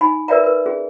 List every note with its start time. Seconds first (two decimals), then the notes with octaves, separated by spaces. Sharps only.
0.01 D#4 G#5 B5
0.28 A#4 B4 D5 E5 G5 A#5
0.44 A#4 B4
0.66 C#4 G#4